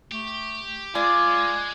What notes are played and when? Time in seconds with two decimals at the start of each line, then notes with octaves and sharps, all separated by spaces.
0.12 A3 G4
0.95 G#3 F4 D5 G#5